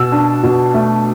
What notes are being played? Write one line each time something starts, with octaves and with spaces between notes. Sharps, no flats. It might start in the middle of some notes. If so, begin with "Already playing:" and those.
Already playing: B2 E6
D4
B2
A3